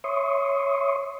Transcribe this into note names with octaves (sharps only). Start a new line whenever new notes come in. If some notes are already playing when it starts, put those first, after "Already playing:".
C#5 E5 C6 C#6 D#6